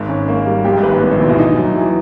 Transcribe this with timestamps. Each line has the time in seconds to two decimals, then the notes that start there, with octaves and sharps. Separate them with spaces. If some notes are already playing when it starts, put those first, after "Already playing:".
Already playing: G#1 G#2
0.09 C#4
0.28 A#3
0.46 G3
0.64 A#1 A#2 G4
0.77 G#1 G#2
0.83 B4
0.89 G2
1.01 A1 A2 B3
1.11 A#1 A#2
1.19 B1 B2 E3
1.29 D#2 D#3
1.39 D#4
1.57 F#3
1.76 E3